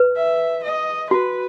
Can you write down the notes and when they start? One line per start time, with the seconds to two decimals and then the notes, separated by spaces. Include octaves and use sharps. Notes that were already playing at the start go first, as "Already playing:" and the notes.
Already playing: B4
0.16 E5
0.63 D#5
1.10 F#4 B4